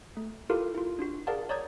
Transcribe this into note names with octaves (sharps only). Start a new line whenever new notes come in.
A3
E4 F4 G4 A4 A#4 F5
E4 F4
D4 F4 F#4
G#4 A#4 D5 F5 F#5 A5
C#5 D5 A#5 D#6 G6 G#6